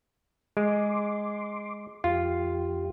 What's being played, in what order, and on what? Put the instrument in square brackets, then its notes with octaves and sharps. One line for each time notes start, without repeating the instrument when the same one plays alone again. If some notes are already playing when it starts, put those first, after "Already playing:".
[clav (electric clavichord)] G#3 [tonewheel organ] C6 D6
[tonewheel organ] F2 G4 [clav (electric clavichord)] F4